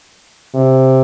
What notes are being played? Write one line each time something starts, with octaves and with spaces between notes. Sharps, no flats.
C3